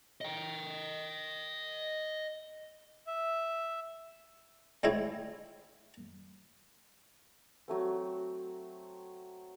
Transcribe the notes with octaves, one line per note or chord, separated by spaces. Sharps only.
D#5 G5
E5
D3 G#3 A3 C4 E4 C#5
F#3 A3 C4